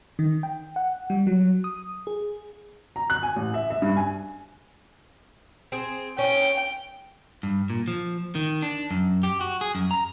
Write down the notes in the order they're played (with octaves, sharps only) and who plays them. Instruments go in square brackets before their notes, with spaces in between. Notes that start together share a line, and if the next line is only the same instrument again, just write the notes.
[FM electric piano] D#3
G5
F#5
G3
F#3
D#6
G#4
[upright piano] A#5
F#6
G#5
A1
E5
E5
G2
G#5
[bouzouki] C4 G#4
[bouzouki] C#4 [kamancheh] G5
[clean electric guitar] G2
A#2
F3
D#3
D4
F#2
G4
F#4
G#4
F#2
A#5